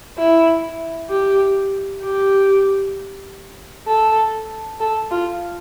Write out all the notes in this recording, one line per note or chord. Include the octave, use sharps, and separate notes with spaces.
E4
G4
G4
A4
A4
F4